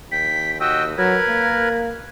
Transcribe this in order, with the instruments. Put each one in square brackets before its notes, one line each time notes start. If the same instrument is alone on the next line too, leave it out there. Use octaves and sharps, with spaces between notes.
[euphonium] D#2 [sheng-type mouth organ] G5 [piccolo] B6
[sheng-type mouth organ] F#4 D#5 G5 [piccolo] E6
[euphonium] F#3 [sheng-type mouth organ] A#4 B4 [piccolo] G#6
[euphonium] A#3